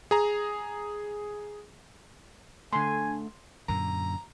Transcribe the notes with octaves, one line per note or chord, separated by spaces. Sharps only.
G#4 A#5
D3 A3 G#5 C6
F#2 A#2 D3 A#5